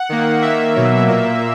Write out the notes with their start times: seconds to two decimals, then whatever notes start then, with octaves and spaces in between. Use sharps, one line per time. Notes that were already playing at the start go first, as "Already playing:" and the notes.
Already playing: F#5
0.09 D#3 A#3
0.42 D#3 A#3 E5
0.75 B2 F#3 A#3
1.08 A#2 A#3